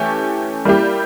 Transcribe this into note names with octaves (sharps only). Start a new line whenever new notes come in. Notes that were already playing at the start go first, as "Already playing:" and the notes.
Already playing: E3 A3 C#4 G4
G3 A#3 E4 G4